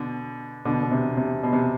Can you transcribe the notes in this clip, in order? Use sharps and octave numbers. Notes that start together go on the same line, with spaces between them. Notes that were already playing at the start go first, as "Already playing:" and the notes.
Already playing: B2 D3
B2 D3
B2
C3
C3
B2
C3